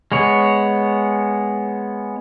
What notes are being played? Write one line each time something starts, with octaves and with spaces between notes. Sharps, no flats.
G#3 B3 C#5